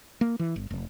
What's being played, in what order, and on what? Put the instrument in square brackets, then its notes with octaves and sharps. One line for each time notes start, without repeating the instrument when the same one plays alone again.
[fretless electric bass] A#3
E3
G1
F1